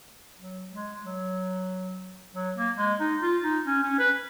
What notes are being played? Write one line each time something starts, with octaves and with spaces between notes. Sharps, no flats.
F#3
G#3
F#3
F#3
A#3
G#3
D#4
F4
D#4
C#4
C#4
B4